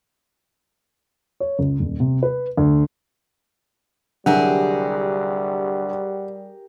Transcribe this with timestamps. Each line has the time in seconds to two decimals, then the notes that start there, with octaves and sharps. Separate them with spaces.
1.40 C#5
1.59 C#2
1.80 D#1
2.00 C3
2.23 B4
2.57 D2
4.26 C2 D3 F#3 G3 G4 G#4 A#4 F#5